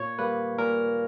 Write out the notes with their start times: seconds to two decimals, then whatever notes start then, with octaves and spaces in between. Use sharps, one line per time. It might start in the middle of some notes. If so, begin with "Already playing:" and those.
Already playing: A#2 C#5
0.19 G3 A#3 B4
0.58 A#2 A#4